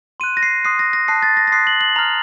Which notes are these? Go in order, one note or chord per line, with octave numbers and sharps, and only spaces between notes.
C6 F#6 D#7
A#6
C7
C6 D#6 F#6 C7
A#6
A#6
A5 D#6 F#6 C7
A6
A#6
A#6
C6 D#6 F#6 C7
F#7
F#7
A#5 F6 F7